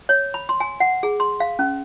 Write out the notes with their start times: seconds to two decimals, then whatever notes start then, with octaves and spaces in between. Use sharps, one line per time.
0.09 C#5
0.34 B5
0.49 C6
0.60 G#5
0.80 F#5
1.03 G#4
1.20 C6
1.40 F5
1.59 C#4